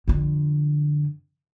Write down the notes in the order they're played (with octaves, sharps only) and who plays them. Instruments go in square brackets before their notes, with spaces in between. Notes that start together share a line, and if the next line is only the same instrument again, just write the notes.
[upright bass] F2 D3